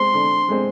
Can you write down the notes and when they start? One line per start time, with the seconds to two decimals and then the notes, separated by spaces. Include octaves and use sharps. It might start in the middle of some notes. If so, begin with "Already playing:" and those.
Already playing: G#3 C4 C6
0.14 D3
0.49 G#3 C4